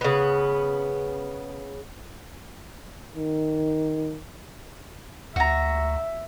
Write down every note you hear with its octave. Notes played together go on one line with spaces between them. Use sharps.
C#3 B3
D#3
D2 F#4 E5 A#5